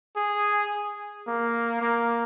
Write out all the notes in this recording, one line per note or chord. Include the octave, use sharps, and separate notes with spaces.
G#4
A#3
A#3